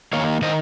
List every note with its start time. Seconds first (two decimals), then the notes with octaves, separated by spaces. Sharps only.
0.13 D#3 A#3 C#5 F5
0.42 D#3 C5 D#5